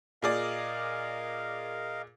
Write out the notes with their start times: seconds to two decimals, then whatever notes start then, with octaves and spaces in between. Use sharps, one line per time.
0.23 A#2 G#4 A#4 D5 D#5 F5